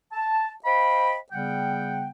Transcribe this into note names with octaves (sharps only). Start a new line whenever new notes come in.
A5
C5 D#5 F5 G5 B5
C#3 G3 B3 F#5 G5